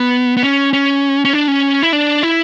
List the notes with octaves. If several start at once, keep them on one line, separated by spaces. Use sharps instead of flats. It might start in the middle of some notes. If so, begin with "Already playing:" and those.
Already playing: B3
B3
C#4
C#4
C#4
D4
C#4
E4
D4
E4